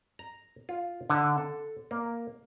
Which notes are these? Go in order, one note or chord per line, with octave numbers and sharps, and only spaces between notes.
A#5
F4
D3
A4
A#3